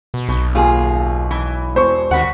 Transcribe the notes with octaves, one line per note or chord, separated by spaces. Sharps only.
B2
B1 B2
D#2 F4 G#4
E3
E1 C5 C#6
D#2 F#4 B4 F#5